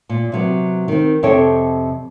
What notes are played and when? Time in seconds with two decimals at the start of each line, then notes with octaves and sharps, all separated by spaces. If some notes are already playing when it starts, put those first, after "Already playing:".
0.09 A#2
0.32 C3 F#3 B3
0.88 D#3 C4
1.23 F2 C3 A4 C#5 G5